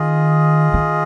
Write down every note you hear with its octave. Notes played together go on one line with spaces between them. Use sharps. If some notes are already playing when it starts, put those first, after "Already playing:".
Already playing: D#3 F4 G#4 D#5
D#3